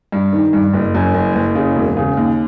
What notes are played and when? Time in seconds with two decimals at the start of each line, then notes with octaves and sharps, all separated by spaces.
0.12 G2
0.33 D#3
0.53 G2
0.73 F#1
0.95 F#2
1.14 F#1
1.35 F#1
1.55 C#3
1.76 E1
1.97 C#3
2.17 D#2